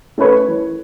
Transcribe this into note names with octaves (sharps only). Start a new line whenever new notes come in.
A3 C#4 A#4 B4 C#5
E3